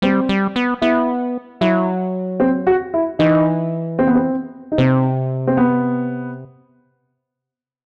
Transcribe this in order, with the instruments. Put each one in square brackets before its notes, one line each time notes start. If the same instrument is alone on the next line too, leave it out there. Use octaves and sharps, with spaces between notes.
[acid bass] G3 [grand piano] C4
[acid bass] G3
B3
[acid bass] B3 [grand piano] E4
[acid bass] F#3 [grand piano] E4
[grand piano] C4
F#4
E4
[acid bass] E3 [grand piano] D#4
[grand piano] C4
B3
C4
D#4
[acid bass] C3 [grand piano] C4
[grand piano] C4
B3